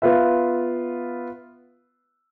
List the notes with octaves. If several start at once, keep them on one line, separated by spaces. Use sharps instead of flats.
B3 F4 B4 E5